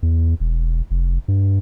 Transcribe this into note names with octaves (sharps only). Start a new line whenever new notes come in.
E2
E1
F1
G2